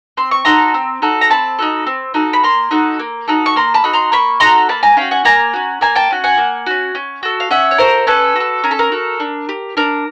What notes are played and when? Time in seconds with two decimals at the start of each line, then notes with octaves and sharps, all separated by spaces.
0.17 C4 C6
0.31 C#6
0.45 D#4 F#4 A4 A#5 C6
0.74 C4
1.02 D#4 F#4 A4
1.21 A#5
1.30 C4 A5 B5
1.59 D#4 F#4 A4
1.87 C4
2.14 D#4 F#4 A4
2.33 B5
2.43 A#3 A#5 C6
2.71 D#4 F#4 A4
2.99 A#3
3.28 D#4 F#4 A4
3.46 C#6
3.56 A#3 A#5 C6
3.74 A5 B5
3.84 D#4 F#4 A4
3.93 A#5 C6
4.12 A#3 B5 C#6
4.40 D#4 F#4 A4 A#5 C6
4.69 A#3 A5 B5
4.83 G#5 A#5
4.97 C#4 F#4 F5 G5
5.11 F#5 G#5
5.25 A#3 G#5 A#5
5.53 C#4 F#4
5.81 A#3 G#5 A#5
5.95 G5 A5
6.10 C#4 F#4
6.24 F#5 G#5
6.38 A#3
6.66 C#4 F#4
6.95 C#4
7.23 F#4 A4
7.40 F5
7.51 C#4 E5 F#5
7.71 C#5
7.78 F#4 A4 A#4 C5
8.07 C#4 A4 B4
8.36 F#4 A4
8.64 C#4 A#4
8.71 A4
8.79 A#4
8.92 F#4 A4
9.20 D4
9.49 G4
9.77 D4 A#4